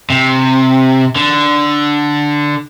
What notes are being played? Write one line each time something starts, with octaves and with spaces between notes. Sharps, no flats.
C3
D3